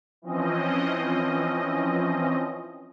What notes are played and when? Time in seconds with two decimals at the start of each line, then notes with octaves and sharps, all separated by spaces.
0.22 E3 F3 C4 C#4 D#5